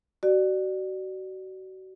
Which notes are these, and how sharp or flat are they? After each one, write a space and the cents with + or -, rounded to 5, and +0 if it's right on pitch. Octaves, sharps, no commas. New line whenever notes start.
F#4 +30 D5 +25